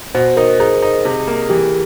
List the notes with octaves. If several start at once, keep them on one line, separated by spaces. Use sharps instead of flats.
B2 C5
D#4 A#4
D#4 G#4
D#4
C3
A#3
E3 G4